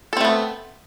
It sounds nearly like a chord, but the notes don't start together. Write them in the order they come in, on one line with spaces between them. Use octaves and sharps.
A4 C4 A3 B3